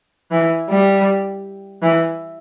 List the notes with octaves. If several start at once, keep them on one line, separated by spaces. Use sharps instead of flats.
E3
G3
E3